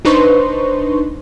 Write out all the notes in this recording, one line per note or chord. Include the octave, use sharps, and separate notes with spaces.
D4 D#4 B4 C5 C6 C#6